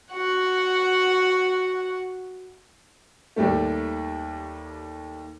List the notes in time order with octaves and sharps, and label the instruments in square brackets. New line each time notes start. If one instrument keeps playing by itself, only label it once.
[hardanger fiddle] F#4 F#5
[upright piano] D#2 G3 A3